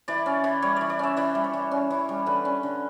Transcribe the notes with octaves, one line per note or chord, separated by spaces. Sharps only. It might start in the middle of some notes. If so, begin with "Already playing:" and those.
E3 D5
C#4
E3
G3 C#5
E3 D5
D5
C#4 E5
E3 D5
G3
C#5
E3
C#4
E3
G3
D3 B4
C#4
D3